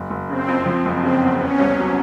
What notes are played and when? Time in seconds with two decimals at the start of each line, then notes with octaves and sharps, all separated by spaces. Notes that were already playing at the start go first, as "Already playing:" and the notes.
Already playing: F#1
0.10 F#1
0.30 C#3 C4
0.48 F2
0.66 F3
0.85 F#1
1.03 C#3 C4
1.22 E2
1.41 B3 C#4
1.60 C2
1.78 F#3